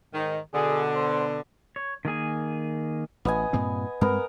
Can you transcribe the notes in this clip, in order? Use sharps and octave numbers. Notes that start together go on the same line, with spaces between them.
G#2 D#3
B2 D3 G#4
C5
C#5
D#3 A#3 G#4 G#5
A1 B3 D#5 G#5
G2 A#2 C4
G2 G#3 B3 C4 A#4